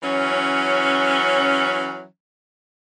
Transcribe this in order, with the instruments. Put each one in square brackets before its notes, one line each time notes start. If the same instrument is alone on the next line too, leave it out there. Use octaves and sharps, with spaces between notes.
[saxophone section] E3 F#3 C#4